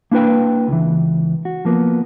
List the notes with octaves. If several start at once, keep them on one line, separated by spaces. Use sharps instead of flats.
A#3 D4 E4 B4 G5
C#2 E3
F#4
F3 A#3 B3